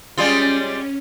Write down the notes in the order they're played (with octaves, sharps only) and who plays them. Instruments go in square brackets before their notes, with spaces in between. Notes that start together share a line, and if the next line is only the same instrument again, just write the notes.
[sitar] G3 G#3 F4 [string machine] C#4